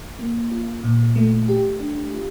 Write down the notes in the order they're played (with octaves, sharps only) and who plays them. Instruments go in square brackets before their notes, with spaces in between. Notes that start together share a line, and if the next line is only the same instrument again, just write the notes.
[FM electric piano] A#3
F4
A#2
A3
G4
D4
F4